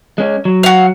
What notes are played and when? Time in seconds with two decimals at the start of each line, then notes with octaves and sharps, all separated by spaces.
0.18 G#3 C#4
0.45 F#3
0.63 F#4 F5